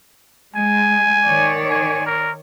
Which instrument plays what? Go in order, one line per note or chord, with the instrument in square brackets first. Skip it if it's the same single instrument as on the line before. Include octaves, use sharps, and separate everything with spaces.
[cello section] G#3 [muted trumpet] G#5
[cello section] D#3 C#5 D5
[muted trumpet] G#5
A#4